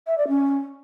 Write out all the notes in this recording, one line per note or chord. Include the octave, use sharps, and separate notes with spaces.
E5
D5
C#4